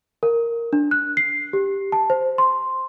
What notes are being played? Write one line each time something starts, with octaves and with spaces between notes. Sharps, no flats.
A#4
D4
F#6
C7
G4
A5
C5
C6